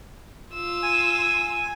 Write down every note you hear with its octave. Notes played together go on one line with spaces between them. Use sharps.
F4 E6
G#5